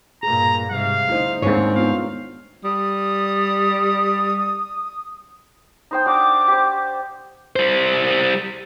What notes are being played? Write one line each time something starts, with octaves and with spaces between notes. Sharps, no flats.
G2 A#2 G#4 A#5
G#2 C3 G3 F5
D2 A3 D#4 E4 C5
D#2 G#2 G#3 C4 D4 C#5
B3 D#4 F4 F5
G3 D#6
D#4 C5 G5
D4 F#4 D5 D6
G4 C5
G3 C5